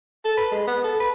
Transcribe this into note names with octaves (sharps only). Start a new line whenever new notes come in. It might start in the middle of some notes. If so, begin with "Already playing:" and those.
A4
B4
G#3
B3
A4
B4